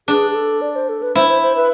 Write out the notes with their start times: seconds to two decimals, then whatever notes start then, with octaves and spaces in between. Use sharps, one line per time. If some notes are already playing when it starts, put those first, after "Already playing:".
0.08 D4 G#4
0.31 G#4
0.35 A4
0.61 D5
0.76 C5
0.89 A4
1.02 B4
1.15 E4 C5
1.29 C5
1.42 C5
1.56 B4